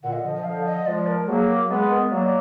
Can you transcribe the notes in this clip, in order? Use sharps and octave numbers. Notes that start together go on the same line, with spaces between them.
A#2 D3 F#5
D#5
D3 F3 D#5
D#5
D3 F3 F5
D#5
F3 G#3 D5
A#4
F#3 A#3 G#4
A#4
G#3 B3 B4
A#4
F#3 A#3 D5
D#5